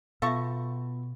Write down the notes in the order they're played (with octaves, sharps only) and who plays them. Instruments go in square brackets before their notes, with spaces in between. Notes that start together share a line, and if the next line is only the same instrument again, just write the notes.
[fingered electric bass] B2 [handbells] B3 F4 B5 [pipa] A4 C#6 [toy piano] E5 F5